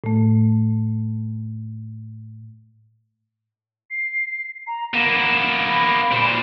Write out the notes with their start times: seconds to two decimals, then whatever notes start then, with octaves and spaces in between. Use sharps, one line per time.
0.04 A2 A3
3.90 C7
4.66 A#5
4.94 A#3 B3 E7
5.68 B5
6.11 A#2 C4